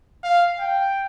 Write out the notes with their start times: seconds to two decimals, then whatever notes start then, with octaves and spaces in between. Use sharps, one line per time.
0.24 F5
0.59 G5